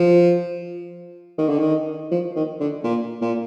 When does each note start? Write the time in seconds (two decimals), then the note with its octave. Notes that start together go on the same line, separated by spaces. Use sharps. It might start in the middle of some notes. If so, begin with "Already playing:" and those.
Already playing: F3
1.38 D#3
1.49 D3
1.59 D#3
2.11 F3
2.36 D#3
2.60 D3
2.84 A#2
3.21 A#2